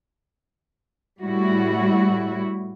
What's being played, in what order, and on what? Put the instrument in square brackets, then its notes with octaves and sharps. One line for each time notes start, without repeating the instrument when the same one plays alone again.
[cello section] A2 G3 E4 F#4